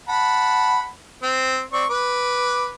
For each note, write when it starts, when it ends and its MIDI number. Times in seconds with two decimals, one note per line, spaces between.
0.08 0.87 78
0.08 0.87 81
0.08 0.87 83
1.22 1.62 60
1.73 1.84 60
1.73 1.84 74
1.73 1.84 85
1.90 2.74 71
1.90 2.74 86